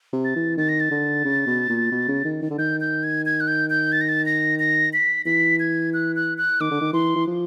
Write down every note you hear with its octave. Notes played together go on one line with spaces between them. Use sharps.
C3
A6
E3
D#3 A6
A#6
A6
D3
C#3
B2
A#2
B2
C#3
D#3
D#3
D3
D#3 G6
G6
G#6
G#6
F#6
G6
G6
A6
A#6
A6
A#6
A#6
B6
E3 B6
G#6
F#6
F#6
F#6
D#3 D6
D3
D#3
E3 C6
E3
F3